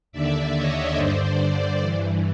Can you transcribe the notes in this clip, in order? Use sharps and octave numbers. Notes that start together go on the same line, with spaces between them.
D#2 D3 D5 E5
C#5 D#5
G2 D3 C5 D5
C5 D5
G2 E3